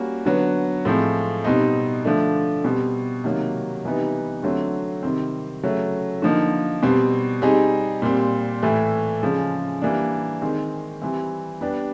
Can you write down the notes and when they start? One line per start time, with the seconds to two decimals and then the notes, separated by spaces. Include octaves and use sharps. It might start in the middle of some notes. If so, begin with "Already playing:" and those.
Already playing: G3 A#3 C#4 F#4
0.25 D3 F#3 B3
0.85 A2 F3 G#3 C4
1.44 B2 G3 C4 D#4
2.05 D3 F3 A3 D4
2.64 B2 G3 C4
3.24 C3 D#3 F#3 A#3
3.84 C3 E3 G3 B3 D#4
4.43 D3 F#3 A3 C4
5.03 C3 D#3 G3 C4
5.63 C#3 F#3 A3
6.22 D3 F3 A#3 D#4
6.83 B2 G3 C4
7.42 G3 C4 D#4 G#4
8.02 A#2 G3 C4
8.63 A2 E3 A3
9.22 C#3 F3 G#3
9.82 E3 G3 A#3 D4
10.41 D#3 G#3 C4
11.02 E3 G3 C4
11.61 G3 B3 D4 G4